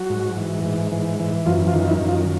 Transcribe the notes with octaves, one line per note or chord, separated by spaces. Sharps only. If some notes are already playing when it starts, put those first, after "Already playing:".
Already playing: F#3 F#4
G#2
E3
G#2
E3
E3
F#2 F3 F4
F3 F4
D#3
F4
E3 E4
F#2
F3 F4